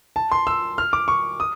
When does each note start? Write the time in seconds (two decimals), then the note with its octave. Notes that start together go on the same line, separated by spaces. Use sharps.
0.16 A5
0.32 C6
0.47 E6
0.78 F6
0.93 D6
1.08 C#6
1.40 D#6